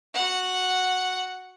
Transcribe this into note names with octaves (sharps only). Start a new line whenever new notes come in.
F#4 F#5